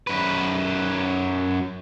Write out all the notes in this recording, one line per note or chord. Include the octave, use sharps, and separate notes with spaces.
F#2 B4